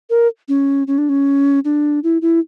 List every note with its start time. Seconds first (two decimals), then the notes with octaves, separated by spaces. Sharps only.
0.10 A#4
0.49 C#4
0.87 C#4
0.98 D4
1.09 C#4
1.65 D4
2.04 E4
2.22 E4